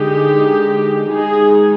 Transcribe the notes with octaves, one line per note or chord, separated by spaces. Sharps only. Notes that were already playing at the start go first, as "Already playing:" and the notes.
Already playing: D3 G#3 D#4 G4
D#3 G#3 D#4 G#4